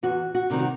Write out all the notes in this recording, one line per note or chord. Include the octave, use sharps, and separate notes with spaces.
E2 F#4
F#4
C3 D#3 G3 C4
F#4